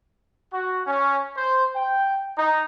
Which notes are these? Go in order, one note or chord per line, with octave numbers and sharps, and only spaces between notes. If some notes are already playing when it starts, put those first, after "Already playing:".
F#4
C#4
C5
G5
D#4